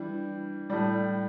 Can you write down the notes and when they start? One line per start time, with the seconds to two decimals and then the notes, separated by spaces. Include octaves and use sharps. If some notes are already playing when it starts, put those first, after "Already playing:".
Already playing: E3 G3 D4
0.70 A2 G3